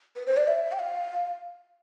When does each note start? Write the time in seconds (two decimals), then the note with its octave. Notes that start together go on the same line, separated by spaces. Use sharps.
0.16 B4
0.27 C5
0.37 D5
0.47 E5
0.72 G5
0.79 F5